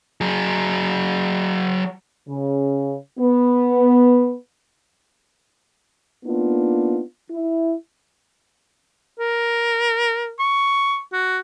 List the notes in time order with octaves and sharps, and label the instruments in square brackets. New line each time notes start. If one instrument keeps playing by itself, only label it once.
[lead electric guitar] F#3 G#4
[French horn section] C#3
B3
A#3 B3 D4 D#4 F4
E4
[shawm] A#4
C#6
F#4